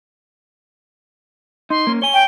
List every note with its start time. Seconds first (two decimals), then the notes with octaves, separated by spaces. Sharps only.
1.70 D#4 C6
1.87 A#3 C#4
2.02 C#5 G#5 G7
2.14 G5